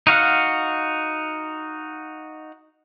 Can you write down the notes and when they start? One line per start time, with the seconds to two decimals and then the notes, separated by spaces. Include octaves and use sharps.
0.07 D#4 F#4 F5 F#5